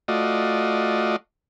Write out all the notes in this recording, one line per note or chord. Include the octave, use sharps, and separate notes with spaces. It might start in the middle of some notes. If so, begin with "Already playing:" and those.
A3 F4 F#4 D5 D#5